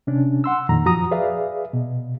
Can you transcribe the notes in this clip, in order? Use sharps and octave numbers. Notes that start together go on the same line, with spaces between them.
C3 C#4 D4
F#5 C6 E6
F2 A#2 D#3 A#5
F#2 F3 F#4 A#5 D#6
G#4 B4 D5 E5 F5
B2